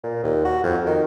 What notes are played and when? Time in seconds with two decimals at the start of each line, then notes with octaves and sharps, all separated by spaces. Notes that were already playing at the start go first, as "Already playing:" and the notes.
0.04 A#2
0.24 D#2
0.45 F#4
0.64 F2
0.86 D#3